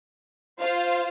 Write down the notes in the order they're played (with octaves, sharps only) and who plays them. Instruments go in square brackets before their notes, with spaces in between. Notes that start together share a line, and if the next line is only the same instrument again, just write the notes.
[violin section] F4 C5 F5